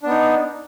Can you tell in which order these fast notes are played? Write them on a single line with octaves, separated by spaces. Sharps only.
D4 B3 D#4